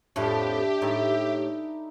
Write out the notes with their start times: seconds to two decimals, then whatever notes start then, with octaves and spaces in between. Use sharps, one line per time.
0.16 F2 A2 D4 G4 E5
0.82 A2 D#4 E4